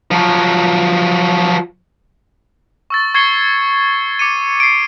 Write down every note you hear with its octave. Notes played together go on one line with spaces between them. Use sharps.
F3 F#3
C#6 E6 A6
C#6 G#6 A6 C7 C#7 G7
D6 C#7 D#7
C7 D7